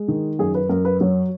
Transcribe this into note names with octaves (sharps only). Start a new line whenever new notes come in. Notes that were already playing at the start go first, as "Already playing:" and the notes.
Already playing: G#3
D#3
F#2 G#4
B4
F#2 A#4
B4
F#3 C#5